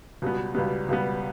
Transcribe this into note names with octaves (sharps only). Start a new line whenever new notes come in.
C#2 B2 G3 B3
C#2 B2 G3 B3
C#2 B2 G3 B3